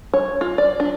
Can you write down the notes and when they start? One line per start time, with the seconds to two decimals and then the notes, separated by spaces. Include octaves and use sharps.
0.14 C#5
0.41 F4
0.58 D5
0.80 D4